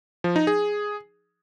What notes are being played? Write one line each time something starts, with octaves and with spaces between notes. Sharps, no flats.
F3
D#4
G#4